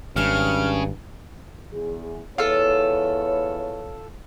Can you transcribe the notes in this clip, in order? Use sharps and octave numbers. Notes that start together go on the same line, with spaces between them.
G#1 G2 C#3 F6
E2 G#4
E2 F4 A4 B4 C#5